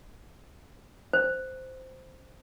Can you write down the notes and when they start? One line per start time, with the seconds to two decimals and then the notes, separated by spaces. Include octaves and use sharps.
1.13 C5